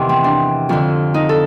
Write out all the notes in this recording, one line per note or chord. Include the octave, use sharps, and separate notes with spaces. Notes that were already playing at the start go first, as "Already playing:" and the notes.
Already playing: E2 C3 D#3
C4
D4
F2 D3
D#4
A4